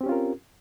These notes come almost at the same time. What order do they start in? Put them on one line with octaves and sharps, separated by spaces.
C4 G4 C#4 F4 A#4